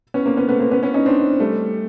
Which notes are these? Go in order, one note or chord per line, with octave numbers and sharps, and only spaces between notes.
B3 C#4
A#3 C4
B3 C#4
A3 B3
A#3 C4
B3 C#4
B3 C#4
C#4 D#4
C4 D4
G3 A3